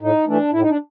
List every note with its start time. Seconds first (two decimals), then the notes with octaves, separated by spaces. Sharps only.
0.01 A2 D#4
0.27 E3 A3 D4
0.52 A2 E4
0.62 D#4
0.69 D4